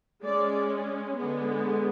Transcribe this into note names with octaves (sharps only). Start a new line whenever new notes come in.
G#3 C#4 D5
D3 G#3 B3